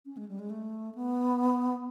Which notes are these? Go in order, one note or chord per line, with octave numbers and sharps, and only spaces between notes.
C#4
G#3
G3
G#3
A3
B3